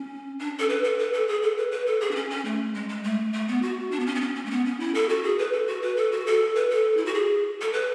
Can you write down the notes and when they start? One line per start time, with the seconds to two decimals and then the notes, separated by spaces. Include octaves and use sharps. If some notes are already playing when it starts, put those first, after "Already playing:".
Already playing: C#4
0.39 D4
0.59 A4
0.69 B4
0.84 A4
0.99 B4
1.13 A4
1.28 G#4
1.42 A4
1.57 B4
1.71 B4
1.86 A4
2.01 G#4
2.11 D4
2.16 C#4
2.30 C#4
2.45 A3
2.74 G#3
2.89 G#3
3.04 A3
3.33 A3
3.48 B3
3.62 F#4
3.91 D4
4.00 B3
4.06 C#4
4.15 B3
4.21 C#4
4.35 C#4
4.46 A3
4.51 B3
4.65 C#4
4.80 E4
4.95 A4
5.09 F#4
5.24 G#4
5.38 B4
5.53 A4
5.67 F#4
5.82 B4
5.97 A4
6.12 F#4
6.26 A4
6.56 B4
6.70 A4
6.97 E4
7.06 F#4
7.14 G#4
7.61 A4
7.73 B4